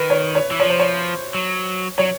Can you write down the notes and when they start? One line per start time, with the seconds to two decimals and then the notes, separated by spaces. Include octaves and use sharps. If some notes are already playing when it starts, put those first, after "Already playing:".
Already playing: D#3 B4
0.10 C#5
0.35 C#5
0.51 E3
0.60 F3 C#5
0.70 C5
0.80 C#5
1.34 F#3
1.98 F#3 C#5